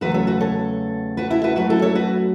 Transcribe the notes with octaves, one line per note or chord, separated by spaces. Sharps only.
E2 C#3 F#3 A3 F#4 B4
A4 C#5
F#4 B4
A4 C#5
F#4 B4
E4 A4
F#4 B4
F#2 F#3 A3 F#4 B4
E4 A4
A4 C#5
F#4 B4